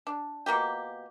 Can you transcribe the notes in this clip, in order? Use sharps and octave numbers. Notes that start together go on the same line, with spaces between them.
D4
B2 A#3 F4 G4